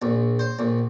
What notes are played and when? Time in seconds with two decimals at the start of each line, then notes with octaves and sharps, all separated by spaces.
0.02 A#1
0.39 C5
0.59 A#1